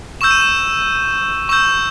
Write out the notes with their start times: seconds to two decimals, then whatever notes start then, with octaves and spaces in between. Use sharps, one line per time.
0.21 C#6 E6 G6 E7
0.31 D#7
0.41 E7
1.49 C#6 E6 G6 E7